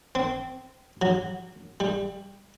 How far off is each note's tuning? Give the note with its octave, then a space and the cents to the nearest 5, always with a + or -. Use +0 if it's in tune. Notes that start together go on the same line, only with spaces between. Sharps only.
C4 -20
F#3 -10
G3 +15